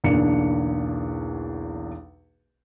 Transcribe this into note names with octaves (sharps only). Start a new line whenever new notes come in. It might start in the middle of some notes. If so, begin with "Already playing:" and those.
B1 E2 D3 A#3 D4 C#7